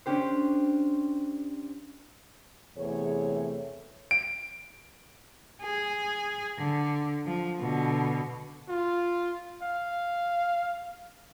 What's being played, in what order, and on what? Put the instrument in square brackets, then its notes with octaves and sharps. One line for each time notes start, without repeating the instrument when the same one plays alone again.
[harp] C#4 D4 G4 C5
[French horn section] E2 C3 A3 G#4 C#5
[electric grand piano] D7
[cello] G#4
D3
F3
B2 D3
[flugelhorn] F4
F5